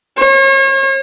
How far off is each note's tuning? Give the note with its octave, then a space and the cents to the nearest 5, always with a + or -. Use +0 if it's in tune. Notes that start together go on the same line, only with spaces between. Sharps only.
C#5 -40